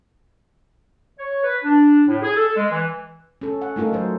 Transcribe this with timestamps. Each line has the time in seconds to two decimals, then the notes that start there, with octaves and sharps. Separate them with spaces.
1.19 C#5
1.44 B4
1.64 D4
2.08 A2
2.22 G#4
2.35 A4
2.56 G#3
2.72 E3
3.41 C#4 A4
3.62 F#5
3.76 A3 D#4 F4 A4 A#4
3.93 F#3 C5